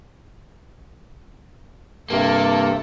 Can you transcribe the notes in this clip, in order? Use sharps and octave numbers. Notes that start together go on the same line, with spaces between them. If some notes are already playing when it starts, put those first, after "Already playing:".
G2 C3 A#3 A4